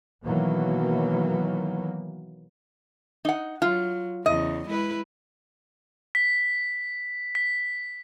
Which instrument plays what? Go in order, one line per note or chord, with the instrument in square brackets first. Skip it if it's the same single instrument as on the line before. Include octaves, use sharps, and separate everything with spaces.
[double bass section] B2 D#3 E3 F#3 A#3
[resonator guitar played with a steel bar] D#4 F#5
[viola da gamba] F#3 [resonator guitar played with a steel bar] F4
[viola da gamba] E2 C#3 [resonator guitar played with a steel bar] D#5
[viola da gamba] G#3 E4 B4
[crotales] B6
B6